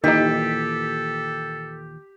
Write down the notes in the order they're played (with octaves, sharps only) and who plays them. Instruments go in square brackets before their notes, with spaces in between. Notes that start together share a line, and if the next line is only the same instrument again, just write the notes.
[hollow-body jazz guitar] D#2 A#2 E3 [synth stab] D#3 D#4 [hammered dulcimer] G4 [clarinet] A4